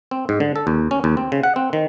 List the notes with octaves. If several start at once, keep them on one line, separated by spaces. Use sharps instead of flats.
C4
G#2
D3
A4
D#2
C#4
D#2
C4
C#3
F#5
C4
D#3